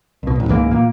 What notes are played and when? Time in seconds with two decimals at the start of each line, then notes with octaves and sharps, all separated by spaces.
0.23 C2 B2
0.36 D1 A1
0.48 C#2 G#2 E3 A#3
0.71 A#2 A#3